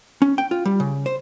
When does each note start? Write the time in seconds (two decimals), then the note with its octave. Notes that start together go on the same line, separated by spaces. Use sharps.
0.22 C#4
0.38 G5
0.51 F4
0.66 G3
0.80 C#3
1.06 C5